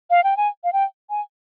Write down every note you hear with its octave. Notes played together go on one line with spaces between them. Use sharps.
F5
G5
G#5
F5
G5
G#5